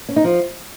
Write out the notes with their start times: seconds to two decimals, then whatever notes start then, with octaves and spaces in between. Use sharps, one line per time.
0.09 C#4
0.16 D#4
0.24 F3